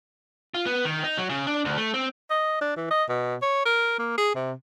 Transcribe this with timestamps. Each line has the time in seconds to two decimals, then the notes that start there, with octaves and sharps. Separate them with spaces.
0.55 F4
0.66 B3
0.85 D#3
1.04 D#4
1.18 F#3
1.30 C#3
1.47 D4
1.65 D2
1.78 A3
1.94 C4
2.31 D#5
2.61 D4
2.77 E3
2.91 D#5
3.09 B2
3.42 C#5
3.65 A#4
3.99 A#3
4.18 G#4
4.35 C3